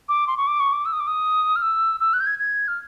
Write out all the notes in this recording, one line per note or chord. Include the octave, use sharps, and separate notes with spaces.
D6
C6
C#6
D6
C#6
D6
E6
D#6
D6
D#6
F6
E6
E6
F#6
G6
G#6
G#6
F6